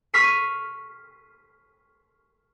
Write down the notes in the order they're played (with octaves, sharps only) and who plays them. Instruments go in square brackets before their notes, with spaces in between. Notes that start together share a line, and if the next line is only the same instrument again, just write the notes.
[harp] C#6 F6 B6 C7 D#7